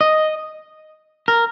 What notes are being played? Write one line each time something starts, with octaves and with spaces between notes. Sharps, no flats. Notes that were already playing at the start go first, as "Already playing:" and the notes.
D#5
A#4